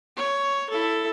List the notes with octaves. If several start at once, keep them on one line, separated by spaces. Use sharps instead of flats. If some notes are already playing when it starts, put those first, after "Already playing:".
C#5
E4 A4